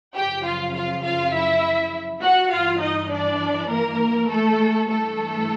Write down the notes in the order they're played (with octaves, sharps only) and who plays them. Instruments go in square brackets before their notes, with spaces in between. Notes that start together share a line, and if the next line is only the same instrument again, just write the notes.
[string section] F#2 C#3 F3 G4 G5
F4 F5
F4 F5
F4 F5
E4 E5
F#4 F#5
G2 E3 F4 F5
D#4 D#5
D4 D5
A#3 A#4
A3 A4
G2 E3 A3 A4